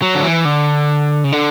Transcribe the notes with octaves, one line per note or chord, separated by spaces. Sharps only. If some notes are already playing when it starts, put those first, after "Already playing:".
F#3
D3
E3
D3
C#3
D3